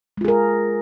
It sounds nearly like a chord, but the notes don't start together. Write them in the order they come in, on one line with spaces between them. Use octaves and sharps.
G#3 F4 G#4 A#4